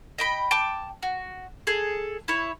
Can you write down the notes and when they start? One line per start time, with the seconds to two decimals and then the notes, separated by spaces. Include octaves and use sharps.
0.18 D#5 G5 B5
0.51 G5 A5 D6
1.03 F#4
1.67 G#4 A4
2.28 E4 C#5